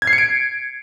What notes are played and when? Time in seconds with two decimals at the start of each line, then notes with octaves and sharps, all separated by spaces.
0.02 G#6
0.07 C7
0.13 C#7
0.18 D7